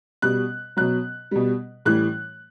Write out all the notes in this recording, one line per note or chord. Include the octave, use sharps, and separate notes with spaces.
B2 G3 F#6
B2 F#3 F#6
B2 G3
A2 E3 G3 F#6